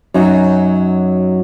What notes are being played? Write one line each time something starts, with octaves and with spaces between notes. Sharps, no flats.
F#2 F#3 D#4